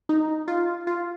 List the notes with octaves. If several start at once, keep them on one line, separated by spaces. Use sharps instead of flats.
D#4
F4
F4